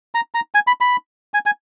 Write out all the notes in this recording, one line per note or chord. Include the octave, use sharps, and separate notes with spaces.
A#5
A#5
G#5
B5
B5
G#5
G#5